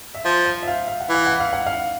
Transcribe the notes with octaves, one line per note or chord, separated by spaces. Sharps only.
E5
F3 F5
F5
E5
F5
F5
F#5
E3
F5
F#5
F5
F#5
F5